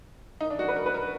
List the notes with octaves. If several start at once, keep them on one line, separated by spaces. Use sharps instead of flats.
D#4
D4
F#4
B4
A#4
B4
A#4